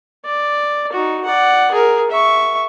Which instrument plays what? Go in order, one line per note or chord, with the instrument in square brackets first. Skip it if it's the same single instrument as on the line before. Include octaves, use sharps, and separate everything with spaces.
[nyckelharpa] D5
D#4 F#4
D5 F#5
G#4 A#4
E5 C#6